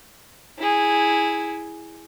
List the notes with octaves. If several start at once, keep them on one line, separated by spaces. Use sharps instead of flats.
E4 G#4